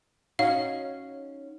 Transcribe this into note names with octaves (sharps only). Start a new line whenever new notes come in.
C#4 D#4 F#4 F5